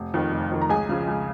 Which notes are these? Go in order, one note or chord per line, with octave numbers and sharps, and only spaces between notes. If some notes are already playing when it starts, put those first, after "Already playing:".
Already playing: F1
F2 D#3
F1
F2 D#3
A#5
C#2 G#4 G#5
C#3 F3
C#2